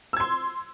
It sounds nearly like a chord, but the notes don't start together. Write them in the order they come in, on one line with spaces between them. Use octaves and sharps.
E6 G#6 C6